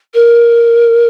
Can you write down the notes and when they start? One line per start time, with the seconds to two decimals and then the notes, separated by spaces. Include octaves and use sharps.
0.14 A#4